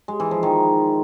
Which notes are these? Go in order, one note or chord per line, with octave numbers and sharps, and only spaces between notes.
G#3
E3
F3
D#3